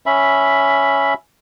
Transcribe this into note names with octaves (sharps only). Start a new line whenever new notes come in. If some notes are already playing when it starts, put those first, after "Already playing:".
C#4 E5 B5